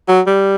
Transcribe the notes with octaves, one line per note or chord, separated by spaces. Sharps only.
F#3
G3